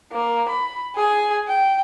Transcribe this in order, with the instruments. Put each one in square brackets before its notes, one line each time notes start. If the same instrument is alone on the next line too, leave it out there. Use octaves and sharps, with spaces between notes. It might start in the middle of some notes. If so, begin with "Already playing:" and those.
[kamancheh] A#3
B5
G#4 G#5
G5